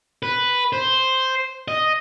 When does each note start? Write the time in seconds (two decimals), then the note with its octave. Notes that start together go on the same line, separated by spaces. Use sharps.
0.23 B4
0.73 C5
1.68 D#5